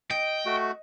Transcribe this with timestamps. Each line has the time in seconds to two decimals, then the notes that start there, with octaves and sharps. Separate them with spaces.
0.10 D#5 G5
0.46 A3 F#4